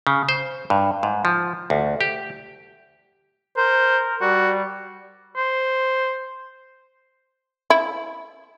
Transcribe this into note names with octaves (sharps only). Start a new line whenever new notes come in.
C#3
C5
G2
G#2
F3
D2
G4
A#4 C5
G3 F#4
C5
E4